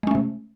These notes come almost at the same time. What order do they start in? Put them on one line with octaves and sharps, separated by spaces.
G#3 C#4 A3 C3